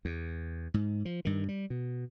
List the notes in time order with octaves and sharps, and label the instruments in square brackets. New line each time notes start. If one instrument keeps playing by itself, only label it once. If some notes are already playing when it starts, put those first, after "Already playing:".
[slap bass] E2
G#2
F3
G2 D#3
G3
B2